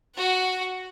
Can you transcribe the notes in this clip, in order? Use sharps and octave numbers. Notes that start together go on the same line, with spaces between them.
F#4 F#5